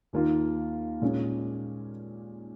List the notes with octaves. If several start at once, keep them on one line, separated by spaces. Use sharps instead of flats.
D#2 D#3 A#3 F4 A#4
A#2 G#3 C#4